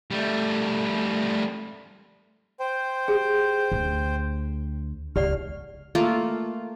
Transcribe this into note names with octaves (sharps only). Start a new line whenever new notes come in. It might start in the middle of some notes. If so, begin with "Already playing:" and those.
G3 A3
C5 G5
G4 G#4
D2
C#2 G4 D5 F#5 F6
A3 A#3 F4